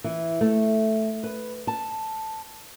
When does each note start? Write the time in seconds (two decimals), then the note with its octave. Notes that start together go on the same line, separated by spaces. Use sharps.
0.04 E3
0.41 A3
1.23 B4
1.67 A5